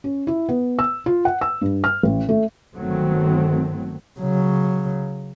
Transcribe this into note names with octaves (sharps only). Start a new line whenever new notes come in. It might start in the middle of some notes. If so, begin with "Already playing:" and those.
C#4
E4
B3
E6
F4
F#5
E6
G2
F6
A1
A3
G1 D#3 F#3 A3 C4
C#3 F#3